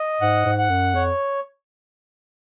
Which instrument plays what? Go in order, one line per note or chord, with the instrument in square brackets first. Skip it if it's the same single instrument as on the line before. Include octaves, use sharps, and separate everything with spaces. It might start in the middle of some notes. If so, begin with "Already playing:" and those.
Already playing: [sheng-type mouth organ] D#5
[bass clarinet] G#2 [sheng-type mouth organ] F#5
[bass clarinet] G#2
[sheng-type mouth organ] F#5
[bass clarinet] F#2
[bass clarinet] F2 [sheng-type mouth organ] C#5